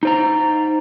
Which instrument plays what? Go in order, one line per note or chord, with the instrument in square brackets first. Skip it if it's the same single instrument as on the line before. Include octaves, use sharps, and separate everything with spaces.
[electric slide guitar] D#4 C5 A#5